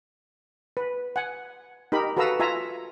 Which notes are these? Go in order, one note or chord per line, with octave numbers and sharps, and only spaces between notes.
B4
F#5 G#5
D#4 G4 A#4 B5
F#4 A4 B4 F5 A#5 E6
F4 E5 G#5 A#5